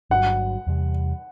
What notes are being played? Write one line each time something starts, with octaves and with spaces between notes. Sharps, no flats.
G1 G2 D3 F#3 F#5
E2 C3 G3